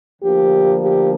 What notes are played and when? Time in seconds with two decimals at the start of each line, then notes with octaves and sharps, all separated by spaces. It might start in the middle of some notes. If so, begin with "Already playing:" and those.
0.21 D2 D3 F3 A#3 G4
0.81 G4